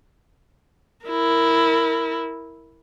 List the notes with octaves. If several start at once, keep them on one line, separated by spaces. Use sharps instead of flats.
E4 A#4